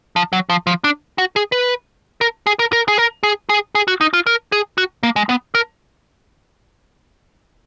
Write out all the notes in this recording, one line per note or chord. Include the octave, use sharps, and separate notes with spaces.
F3
F#3
F3
F3
D4
F#4
G#4
B4
A#4
G#4
A#4
A#4
G#4
A#4
G#4
G#4
G#4
F#4
D#4
F4
A#4
G#4
F#4
A#3
G#3
B3
A#4